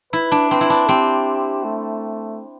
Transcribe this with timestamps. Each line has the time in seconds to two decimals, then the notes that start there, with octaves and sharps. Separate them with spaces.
0.13 E4 B4
0.32 D4
0.51 C4 B4
0.61 E4
0.70 D4
0.89 C4 G4
1.64 A3